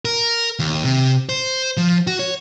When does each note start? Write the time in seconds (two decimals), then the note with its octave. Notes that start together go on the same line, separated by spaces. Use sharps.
0.05 A#4
0.59 D#2
0.84 C3
1.29 C5
1.77 F3
2.07 F#4
2.19 C#5